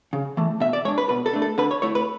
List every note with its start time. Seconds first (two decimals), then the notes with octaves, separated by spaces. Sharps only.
0.13 C#3
0.37 E3 A3
0.60 B2 E5
0.73 D5
0.85 G#3 C#5
0.88 D4
0.98 B4
1.09 B2 B4
1.26 A4
1.33 A3 D4
1.42 A4
1.58 D3 B4
1.71 C#5
1.82 A3 E4 C#5
1.95 B4